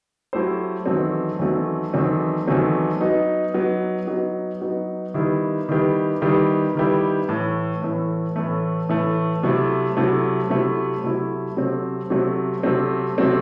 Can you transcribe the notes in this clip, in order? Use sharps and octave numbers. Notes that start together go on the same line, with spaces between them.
F#3 A3 E4 G4 C5
E2 D#3 F#3 A3 C4
E2 D#3 F#3 A3 C4
E2 D#3 F#3 A3 C4
E2 D#3 F#3 A3 C4
F#3 B3 D#4
F#3 B3 D#4
F#3 B3 D#4
F#3 B3 D#4
D#3 G3 B3 E4 G4
D#3 G3 B3 E4 G4
D#3 G3 B3 E4 G4
D#3 G3 B3 E4 G4
A2 E3 A3
A2 E3 A3
A2 E3 A3
A2 E3 A3
C3 F#3 A3 E4
C3 F#3 A3 E4
C3 F#3 A3 E4
C3 F#3 A3 E4
C3 F#3 A3 C4
C3 F#3 A3 C4
C3 F#3 A3 C4
C3 F#3 A3 C4